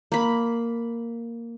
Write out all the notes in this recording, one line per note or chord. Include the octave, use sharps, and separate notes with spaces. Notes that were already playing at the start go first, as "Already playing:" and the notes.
A#3 B5